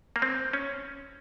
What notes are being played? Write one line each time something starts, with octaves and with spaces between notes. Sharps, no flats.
A#3
C4
C#4